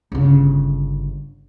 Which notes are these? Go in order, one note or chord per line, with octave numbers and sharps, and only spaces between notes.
G1 C#3